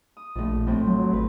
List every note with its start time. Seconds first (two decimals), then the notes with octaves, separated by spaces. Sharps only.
0.17 D#6
0.36 A#1 F2 A2
0.67 A2 C4
0.86 F#3
1.13 G#1 B4